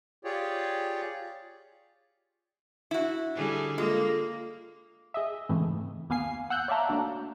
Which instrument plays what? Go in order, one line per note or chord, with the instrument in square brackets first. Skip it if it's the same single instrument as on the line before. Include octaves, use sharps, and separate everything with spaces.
[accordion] F4 G4 G#4 C#5 D5
[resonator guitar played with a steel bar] E4 F#4
[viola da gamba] D3 G3 G#4
[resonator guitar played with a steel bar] G#3 [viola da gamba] A#3 [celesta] F4 A4
[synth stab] G#4 D#5 E5
G#2 C#3 E3 A3 C4
D#2 A#3 B3 F5 G#5 C7
F#5 E6 F#6 G6
C#5 D5 E5 F5 A5 A#5
A3 A#3 D4 F#4